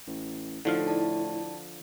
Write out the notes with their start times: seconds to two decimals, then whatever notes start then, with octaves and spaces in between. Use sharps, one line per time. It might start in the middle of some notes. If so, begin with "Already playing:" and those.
0.07 A1
0.65 A2 D3 F3 D#4 E4 A4 F5
0.87 D5 A5